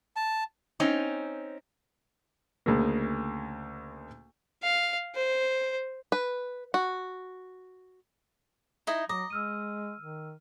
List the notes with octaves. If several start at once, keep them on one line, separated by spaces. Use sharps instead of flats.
A5
C4 C#4 D#4
D2 C#3 A#3
F5
C5
B4
F#4
D#4 E4 D#5
F#3 D#5 A#5 D6 A#6
G#3 E6 F6 D#7
D#3